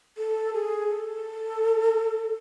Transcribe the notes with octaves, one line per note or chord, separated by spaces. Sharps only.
A4
G#4
A4